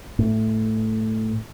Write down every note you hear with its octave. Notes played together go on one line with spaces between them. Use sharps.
A2